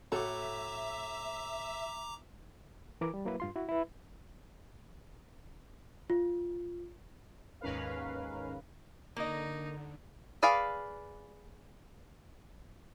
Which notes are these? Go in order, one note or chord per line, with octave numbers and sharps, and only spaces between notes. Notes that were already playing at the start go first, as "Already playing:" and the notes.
A2 F#4 A4 E5 A#5 D6
E3 E4 A#4 D6
G3
F#3 A#3 E4 B4
G2 F4 C6
E4 F#4
E4 B4
F4
D#2 G#2 C#4 A#4 B4 F5
D3 A#3 D#4 D#5
G#4 B4 D5 F5